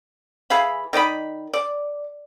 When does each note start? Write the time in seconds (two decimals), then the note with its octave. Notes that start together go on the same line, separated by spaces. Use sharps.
0.50 E3 G#4 F5 B5
0.93 D#3 D5 D#5 B5
1.53 D5